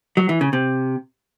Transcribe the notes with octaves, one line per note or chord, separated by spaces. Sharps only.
F#3
E3
C#3
C3